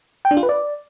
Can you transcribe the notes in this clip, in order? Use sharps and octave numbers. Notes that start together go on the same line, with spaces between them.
G5
D4
F4
B4
D5